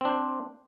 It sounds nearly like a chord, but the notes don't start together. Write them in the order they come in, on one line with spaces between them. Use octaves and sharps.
C4 D4 C5